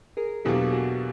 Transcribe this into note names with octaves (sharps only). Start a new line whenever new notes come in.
G#4 A#4
E2 B2 F#3 A#3 D4 G4 A4
F#4 G#4